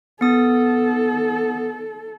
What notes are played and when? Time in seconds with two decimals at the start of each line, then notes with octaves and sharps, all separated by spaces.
0.21 B3 A4 D#6